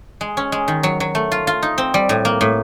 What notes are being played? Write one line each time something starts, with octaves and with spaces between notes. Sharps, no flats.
G#3
C#4
G#3
D#3
F#3
F#3
A3
F4
F4
D#4
C4
G3
A2
A#3
A2